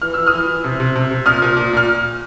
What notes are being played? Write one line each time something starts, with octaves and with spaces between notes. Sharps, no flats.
E3 F6
E3 E6
D#6 F6
E3
E3
C3
C3
C3
C3
A#2 D#6 F6
A#2
A#2
A#2 F6